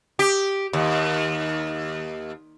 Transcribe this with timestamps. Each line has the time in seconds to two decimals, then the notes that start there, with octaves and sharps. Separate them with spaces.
0.19 G4
0.73 D#2